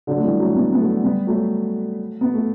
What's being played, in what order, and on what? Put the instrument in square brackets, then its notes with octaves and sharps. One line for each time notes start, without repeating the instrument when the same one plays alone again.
[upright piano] D3 F#3
A3
E3 G3
F#3 A3
G3 B3
B3
F#3 A3
G3 B3
F#3 A3
B3
A3